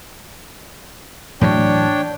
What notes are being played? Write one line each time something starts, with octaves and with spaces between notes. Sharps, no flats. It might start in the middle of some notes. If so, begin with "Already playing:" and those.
A2 E3 F#3 D4 C#5 G5